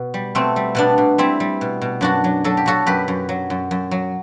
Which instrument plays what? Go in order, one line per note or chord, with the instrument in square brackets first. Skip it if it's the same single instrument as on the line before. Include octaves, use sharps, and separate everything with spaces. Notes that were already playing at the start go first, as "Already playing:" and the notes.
Already playing: [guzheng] B2
G3
B2 A3 C4
G3
B2 B3 D4
B2
G3 C4 E4
G3
B2
B2
F#2 D4 F#4
F#3
F#3 A4
G4
F#3 F#4 A4
F#2 G4 B4
F#2
F#3
F#2
F#2
F#3